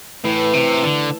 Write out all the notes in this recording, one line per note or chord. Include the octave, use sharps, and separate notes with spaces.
A2 E3
C3 A3
D3 A4